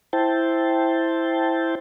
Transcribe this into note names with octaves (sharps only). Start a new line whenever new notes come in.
E4 C5 G5 A5